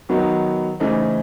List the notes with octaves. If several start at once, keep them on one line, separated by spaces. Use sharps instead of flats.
D#3 F#3 B3 D#4
C#3 E3 A3 C4 D#4